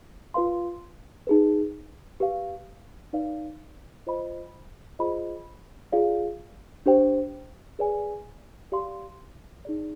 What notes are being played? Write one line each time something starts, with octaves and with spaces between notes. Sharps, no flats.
F4 B4 F5 C6
D#4 G#4 B4
G4 B4 F5
D#4 B4 D5 F5
F4 C5 D#5 B5
F4 G#4 C5 D#5 B5
F4 G#4 D5 F5
D4 G4 C5 G5
G#4 B4 D5 G#5
G4 D5 F5 C6
D#4 G#4 D5